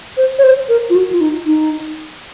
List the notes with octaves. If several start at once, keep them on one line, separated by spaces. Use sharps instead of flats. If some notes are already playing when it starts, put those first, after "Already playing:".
C5
C#5
C5
A#4
F4
F#4
F4
D#4
D#4